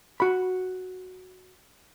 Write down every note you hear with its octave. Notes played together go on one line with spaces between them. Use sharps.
F#4 B5